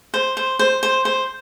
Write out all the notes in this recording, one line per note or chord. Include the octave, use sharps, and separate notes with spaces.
C5
C5
C5
C5
C5